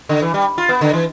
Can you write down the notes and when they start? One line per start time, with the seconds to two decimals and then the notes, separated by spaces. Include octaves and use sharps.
0.09 D3
0.22 E3
0.34 G3
0.58 F4
0.69 B3
0.81 D3
0.94 E3